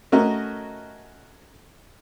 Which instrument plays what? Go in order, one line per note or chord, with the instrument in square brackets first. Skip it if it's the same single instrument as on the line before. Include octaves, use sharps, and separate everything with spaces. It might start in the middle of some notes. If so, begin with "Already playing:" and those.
[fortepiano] A3 C#4 F#4 A#4 D#5